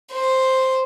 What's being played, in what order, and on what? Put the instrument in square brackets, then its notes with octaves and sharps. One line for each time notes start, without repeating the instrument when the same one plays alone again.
[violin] C5